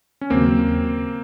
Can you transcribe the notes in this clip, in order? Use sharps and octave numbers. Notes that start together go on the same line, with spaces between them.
C#4
D#2 C#3 F#3 A#3 C4